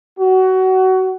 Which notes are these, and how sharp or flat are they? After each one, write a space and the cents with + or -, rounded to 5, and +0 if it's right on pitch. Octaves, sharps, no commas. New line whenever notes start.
F#4 +25